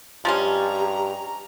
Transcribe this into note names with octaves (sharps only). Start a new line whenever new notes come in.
G2 F3 G#3 C#4 G4 A#5